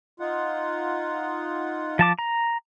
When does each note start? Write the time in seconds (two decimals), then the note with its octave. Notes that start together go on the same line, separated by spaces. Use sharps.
0.20 D#4 F4 F#5
1.99 F3 A5 D6
2.19 A#5